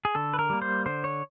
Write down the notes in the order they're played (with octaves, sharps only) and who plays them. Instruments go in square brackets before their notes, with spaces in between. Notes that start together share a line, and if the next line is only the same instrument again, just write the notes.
[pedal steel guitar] G#4
D3 A4
B4
A#4
G3 A#3
C5
D3 C5
C#5